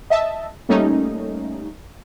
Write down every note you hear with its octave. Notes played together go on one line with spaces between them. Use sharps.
D#5 E5 A5
G3 A3 A#3 C#4 D#4